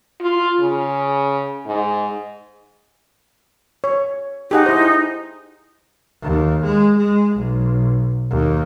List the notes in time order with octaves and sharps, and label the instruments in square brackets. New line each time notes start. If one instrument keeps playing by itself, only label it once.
[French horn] F4
C#3
G#2
[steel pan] C#5
[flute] D#4 [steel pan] G4 G#4 F#5
[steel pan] E4 C5
[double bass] D#2
G#3
G#3
B1
D#2